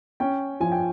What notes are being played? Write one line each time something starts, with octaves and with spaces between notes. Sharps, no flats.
C#4 G5
F3 G#5
G5